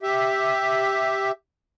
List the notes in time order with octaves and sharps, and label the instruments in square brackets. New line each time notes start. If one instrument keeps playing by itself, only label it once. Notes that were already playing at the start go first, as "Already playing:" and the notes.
[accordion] G4 E5